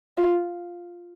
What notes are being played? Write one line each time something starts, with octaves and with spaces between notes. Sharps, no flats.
F4